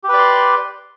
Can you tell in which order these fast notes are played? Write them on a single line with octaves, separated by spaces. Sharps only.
G4 B4 D5 C6